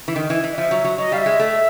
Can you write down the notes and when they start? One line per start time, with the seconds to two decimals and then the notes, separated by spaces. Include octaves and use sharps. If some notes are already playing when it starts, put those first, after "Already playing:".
0.08 E3
0.16 D#3
0.30 E3
0.44 E3
0.53 D#5
0.57 F3 E5
0.71 F#3
0.84 F#3
0.98 F#3 D#5
1.12 G3 F5
1.18 E5
1.26 G#3
1.39 A3